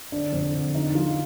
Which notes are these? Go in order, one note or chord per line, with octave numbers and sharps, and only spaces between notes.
D3 D4
F2
D3
F3 D#4
F3 F4